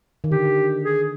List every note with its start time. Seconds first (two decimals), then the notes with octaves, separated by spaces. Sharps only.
0.24 D#3
0.31 D3 G4
0.84 G#4